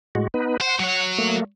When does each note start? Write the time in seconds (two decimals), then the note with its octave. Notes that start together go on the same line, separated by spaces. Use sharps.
0.15 A2 G#3 F#4
0.34 B3 D#4 B4
0.61 C5 F#5
0.80 F#3 C#5
1.18 A3 A#3